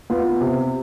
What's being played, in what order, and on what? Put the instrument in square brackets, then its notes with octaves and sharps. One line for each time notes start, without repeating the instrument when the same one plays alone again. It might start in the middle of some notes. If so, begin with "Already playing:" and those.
[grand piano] B3 F4
C3